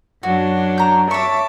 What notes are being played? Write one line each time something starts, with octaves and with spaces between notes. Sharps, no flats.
F#2 F#3 D4 F#4
A#5 G6
C#5 E5 A5 C#6 D6